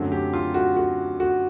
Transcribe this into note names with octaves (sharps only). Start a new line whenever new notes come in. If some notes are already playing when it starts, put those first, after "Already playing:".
Already playing: F#2 D3 F#3 A3 C4
G4
F4
F#4
F#4
F#4